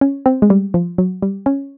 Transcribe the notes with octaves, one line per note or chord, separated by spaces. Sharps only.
C#4
C4
G#3
G3
F3
F#3
G3
C#4